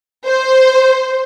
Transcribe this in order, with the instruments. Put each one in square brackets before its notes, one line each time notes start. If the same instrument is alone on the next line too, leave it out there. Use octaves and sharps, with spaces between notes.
[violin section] C5